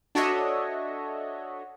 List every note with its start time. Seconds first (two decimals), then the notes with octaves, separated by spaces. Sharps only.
0.15 D4 F#4 A4 C#5 D#5 E5